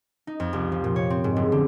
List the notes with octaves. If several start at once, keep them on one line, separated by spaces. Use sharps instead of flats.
D#4
F2
C2
F3
A#2
C#5
C4
G#2
F#1
D3